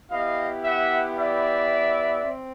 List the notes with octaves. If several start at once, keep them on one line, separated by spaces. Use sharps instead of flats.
B3 E4 G4 D#5 F5
E5 F#5
D5 E5
C4